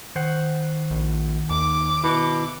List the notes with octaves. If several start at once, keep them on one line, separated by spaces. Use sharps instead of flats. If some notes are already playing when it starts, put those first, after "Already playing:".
D#3 C5 F#5
A#1
D#2 D6
B2 E4